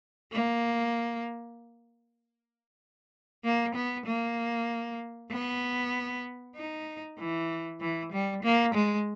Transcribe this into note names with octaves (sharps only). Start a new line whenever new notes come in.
A#3
A#3
B3
A#3
B3
D#4
E3
E3
G3
A#3
G#3